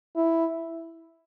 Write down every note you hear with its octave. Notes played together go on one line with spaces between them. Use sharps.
E4